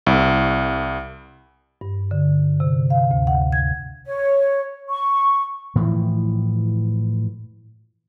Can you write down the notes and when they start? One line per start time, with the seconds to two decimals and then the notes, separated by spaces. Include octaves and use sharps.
0.07 C2
1.81 G2
2.11 D3
2.60 C3
2.90 F5
3.11 D2
3.27 F#5
3.52 G#6
4.06 C#5
4.90 C#6
5.76 A2 E3 F3